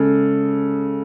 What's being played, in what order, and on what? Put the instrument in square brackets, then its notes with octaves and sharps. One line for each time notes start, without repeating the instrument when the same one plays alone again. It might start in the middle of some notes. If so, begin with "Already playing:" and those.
Already playing: [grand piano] C#3 G#3 A4